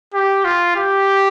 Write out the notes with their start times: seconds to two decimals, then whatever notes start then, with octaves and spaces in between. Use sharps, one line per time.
0.14 G4
0.45 F4
0.76 G4